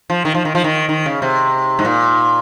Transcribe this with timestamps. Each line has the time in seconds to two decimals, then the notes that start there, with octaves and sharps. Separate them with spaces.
0.10 F3
0.25 D#3
0.35 F3
0.45 D#3
0.55 F3
0.64 D#3
0.89 D#3
1.06 C#3
1.22 C3
1.79 G#2
1.85 A#2